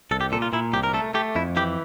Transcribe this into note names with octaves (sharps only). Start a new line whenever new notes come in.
C2 A4
G4
A#2 A4
F4
A#2 E4
C2 G4
A#4
A3 A4
A3 G4
F2 E4
E3 G4